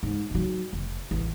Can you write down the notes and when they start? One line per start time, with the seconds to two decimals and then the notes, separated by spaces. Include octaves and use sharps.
0.03 G#2
0.31 G#2 F#3
0.73 F1
1.11 A1 E2